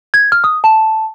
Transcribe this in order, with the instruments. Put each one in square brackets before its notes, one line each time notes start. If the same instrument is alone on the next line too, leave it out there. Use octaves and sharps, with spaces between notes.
[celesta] G#6
F6
D#6
A5